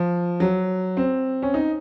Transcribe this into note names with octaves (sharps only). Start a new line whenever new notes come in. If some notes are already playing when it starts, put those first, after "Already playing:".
Already playing: F3
F#3
C4
C#4
D#4